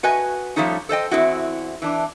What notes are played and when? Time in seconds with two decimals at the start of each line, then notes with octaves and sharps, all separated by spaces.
0.03 F#4 B4 D#5 G#5
0.56 F3 G3 A3 C#4 D#4
0.89 A4 C5 D#5 G5
1.11 E2 G#2 C4 E4 F#4
1.82 E3 D4